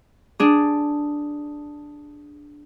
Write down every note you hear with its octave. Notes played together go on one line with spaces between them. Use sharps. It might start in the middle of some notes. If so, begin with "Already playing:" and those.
D4 G#4